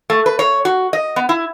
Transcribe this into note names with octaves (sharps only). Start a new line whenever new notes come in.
A3
B4
C#5
F#4
D#5
B3
E4